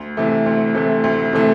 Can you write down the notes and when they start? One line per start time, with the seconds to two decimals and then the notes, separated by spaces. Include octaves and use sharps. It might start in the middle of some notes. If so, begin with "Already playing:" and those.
Already playing: D2
0.17 C3 E3 A3
0.46 D2
0.75 C3 E3 A3
1.04 D2
1.33 C3 E3 A3